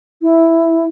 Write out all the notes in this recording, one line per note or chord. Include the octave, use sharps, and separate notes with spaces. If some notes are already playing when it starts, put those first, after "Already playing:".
E4